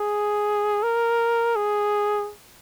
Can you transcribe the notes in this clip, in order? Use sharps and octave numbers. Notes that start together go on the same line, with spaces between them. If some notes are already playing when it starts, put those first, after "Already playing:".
Already playing: G#4
A#4
G#4